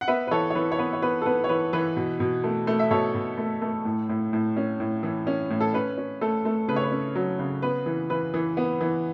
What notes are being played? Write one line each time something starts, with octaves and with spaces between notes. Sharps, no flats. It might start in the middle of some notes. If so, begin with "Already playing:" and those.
F#5
B3 B4 E5
B4
E3 A4 C#5
C#5
E3 B4
C#5
B3 B4
C#5
B3 B4
A4
B3 B4
C#5
E3 B4
E3 B4
B2
B2
A3
A3
E5
B2 A4 C#5
B2
A3
A3
A2
A2
A2
C#4
A2
E3
C#4
A2
A4
C#4 B4
C#4
A3 A4
A3
C#3 B4
C#5
B4
C#4
F#3
C#3
B3 B4
E3
E3 B4
E3
B3
E3